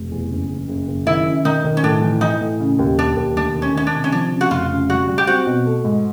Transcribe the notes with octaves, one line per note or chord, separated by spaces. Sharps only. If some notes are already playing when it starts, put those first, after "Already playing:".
Already playing: F1
E2
F#1
F#1
F#1
F#1
D#3 E4
C#4
D#3 D#4
D#3
C#4
A2 D4
E3
E3 D#4
A2
C#3
D#2
D#2 D4
D#2
D2 D4
D#3
C#4
D#3 C#4
D4
C3
C#4
F3 D4
C#3
F#4
F1 F4
C#3
G3 F#4
G3
G4
C4 F#4
B2
A3
G#2